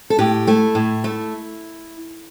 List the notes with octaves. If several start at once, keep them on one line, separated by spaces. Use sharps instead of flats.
A4
A2 G4
A3 E4
A2
A3